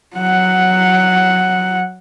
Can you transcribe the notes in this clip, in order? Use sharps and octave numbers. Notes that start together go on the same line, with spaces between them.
F#3 F#5